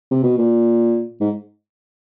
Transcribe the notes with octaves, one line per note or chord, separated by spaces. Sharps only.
C3
B2
A#2
G#2